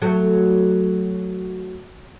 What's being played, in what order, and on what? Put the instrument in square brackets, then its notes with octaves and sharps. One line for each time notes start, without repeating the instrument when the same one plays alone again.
[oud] F#3 A3